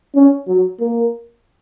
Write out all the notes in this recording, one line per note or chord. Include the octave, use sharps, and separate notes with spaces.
C#4
F#3
A#3